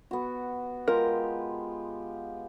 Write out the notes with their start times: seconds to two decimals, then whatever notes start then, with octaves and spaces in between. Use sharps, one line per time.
0.11 B3 F#4
0.88 G#3 F4 G4 A#4